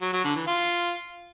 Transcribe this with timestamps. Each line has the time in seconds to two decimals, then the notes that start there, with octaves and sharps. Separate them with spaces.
0.02 F#3
0.13 F#3
0.24 D3
0.36 E3
0.47 F4